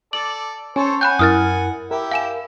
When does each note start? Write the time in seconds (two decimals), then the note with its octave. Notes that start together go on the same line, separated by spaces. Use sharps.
0.13 A4 D5 D6 F#7
0.76 C#4 A4 C5 C#5 G#5
1.01 F#5 G#5 B5 F#6 G6
1.19 F#2 E4 A#4 D#6 F6 A6
1.91 E4 G4 A#4 E5
2.11 F5 G#5 E7